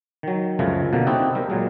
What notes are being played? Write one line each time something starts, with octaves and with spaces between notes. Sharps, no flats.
D#3 F#3
C#2 F#2 C#3 F3 G#3 A3
B2 D3 A#3
C4 D#4 E4 F#4 G4 A4
G3 A#4
A#2 F#3 G#3